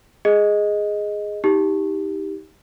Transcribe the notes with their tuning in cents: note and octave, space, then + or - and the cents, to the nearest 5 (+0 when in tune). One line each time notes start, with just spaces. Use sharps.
G#4 +0 D#5 +0
D#4 +25 G4 +0